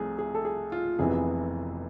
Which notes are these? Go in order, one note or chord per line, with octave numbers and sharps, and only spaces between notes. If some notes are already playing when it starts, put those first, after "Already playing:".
Already playing: C2 C3 F3 A3 G#4
G#4
A4
G#4
F4
F1 F2 C3 E3 B3 G#4